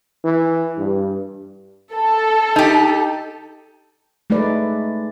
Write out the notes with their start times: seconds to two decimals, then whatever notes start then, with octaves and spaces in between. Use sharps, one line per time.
0.24 E3
0.78 G2
1.94 A4
2.56 D#4 G4
4.30 G#3 A3 D#4 B4 D5